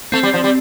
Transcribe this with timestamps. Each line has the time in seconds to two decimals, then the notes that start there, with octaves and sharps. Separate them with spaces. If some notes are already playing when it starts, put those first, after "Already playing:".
0.12 A3 C4
0.23 G3
0.34 F3
0.44 G3